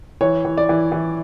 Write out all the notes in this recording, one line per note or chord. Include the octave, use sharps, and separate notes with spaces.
E3 C#5
E3
D5
E3
E3